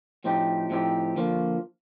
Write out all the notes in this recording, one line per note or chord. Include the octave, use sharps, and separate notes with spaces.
A2 F3 C4 D#4 G4
A2 F3 C4 D#4 G4
D3 F3 A#3